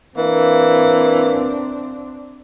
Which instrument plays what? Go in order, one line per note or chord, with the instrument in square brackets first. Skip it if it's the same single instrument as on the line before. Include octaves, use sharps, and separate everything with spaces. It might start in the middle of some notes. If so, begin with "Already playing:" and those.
[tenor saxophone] E3 [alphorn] A#3 [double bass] C4 D4